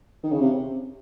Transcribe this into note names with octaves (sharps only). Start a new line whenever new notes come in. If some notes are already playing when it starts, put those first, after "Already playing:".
D#3
C#3
C3